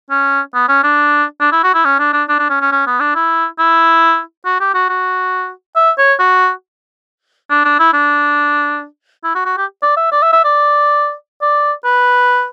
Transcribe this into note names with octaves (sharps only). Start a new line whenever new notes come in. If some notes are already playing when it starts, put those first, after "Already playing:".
C#4
B3
C#4
D4
D4
E4
F#4
E4
C#4
D4
D4
D4
D4
C#4
C#4
C#4
B3
D4
E4
E4
F#4
G4
F#4
F#4
E5
C#5
F#4
D4
D4
E4
D4
E4
F#4
F#4
G4
D5
E5
D5
E5
E5
D5
D5
B4